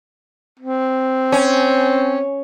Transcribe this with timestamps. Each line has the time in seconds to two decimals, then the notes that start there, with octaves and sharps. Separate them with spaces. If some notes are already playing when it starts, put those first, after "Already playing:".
0.59 C4
1.32 C#4